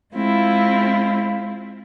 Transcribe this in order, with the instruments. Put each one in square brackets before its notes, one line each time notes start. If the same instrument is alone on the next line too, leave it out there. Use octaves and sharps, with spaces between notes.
[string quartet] G#3 C4 E4 F4